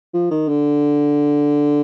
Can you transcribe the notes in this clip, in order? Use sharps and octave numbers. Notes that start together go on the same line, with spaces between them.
F3
D#3
D3